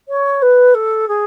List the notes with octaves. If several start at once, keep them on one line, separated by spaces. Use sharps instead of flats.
C#5
B4
A4
G#4